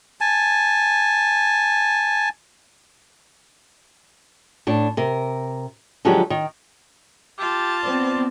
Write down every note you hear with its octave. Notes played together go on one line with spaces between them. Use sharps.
G#5 A5
A2 D4 A5
C3 A#4
D3 F3 F#3 G#3 F4 G4
D#3
F4 G4 A5
B3 C4 D5